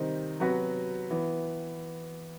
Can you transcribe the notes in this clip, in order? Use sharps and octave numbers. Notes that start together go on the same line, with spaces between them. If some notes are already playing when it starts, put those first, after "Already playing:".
Already playing: C3 D#3 G3 C4 D#4
C3 F#3 B3 F#4 B4
E3 B3